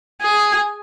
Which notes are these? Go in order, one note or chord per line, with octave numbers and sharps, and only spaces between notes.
G#4